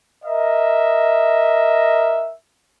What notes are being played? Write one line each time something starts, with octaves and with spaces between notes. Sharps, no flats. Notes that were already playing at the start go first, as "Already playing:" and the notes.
A#4 D#5 E5